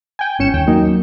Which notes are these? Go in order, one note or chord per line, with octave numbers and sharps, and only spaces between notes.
G5 G#5
G1 C#4 C#7 E7
D#2 G5
F#3 A#3 D#4